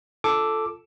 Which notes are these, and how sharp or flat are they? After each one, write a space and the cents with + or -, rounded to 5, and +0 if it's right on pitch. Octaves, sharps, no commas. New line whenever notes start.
F4 -5 A4 +0 D6 +0